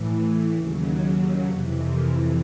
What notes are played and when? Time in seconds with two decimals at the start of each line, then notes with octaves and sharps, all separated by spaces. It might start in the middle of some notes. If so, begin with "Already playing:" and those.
Already playing: A2 E3
0.54 D#2 C#3 F#3
1.44 F2 C3 E3 B4
1.89 A#4